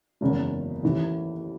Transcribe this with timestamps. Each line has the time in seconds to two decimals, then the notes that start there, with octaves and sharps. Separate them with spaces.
0.21 F#1 E2 C#3 G#3
0.82 A1 A2 E3